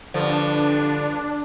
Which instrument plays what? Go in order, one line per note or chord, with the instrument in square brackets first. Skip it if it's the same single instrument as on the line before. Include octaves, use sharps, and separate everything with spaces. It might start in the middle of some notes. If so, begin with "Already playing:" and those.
[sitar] G2 F3 [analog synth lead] D3 [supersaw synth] D4